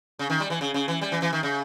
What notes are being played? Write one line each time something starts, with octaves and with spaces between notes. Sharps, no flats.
C#3
D#3
G3
E3
C#3
C#3
E3
G3
E3
E3
D#3
C#3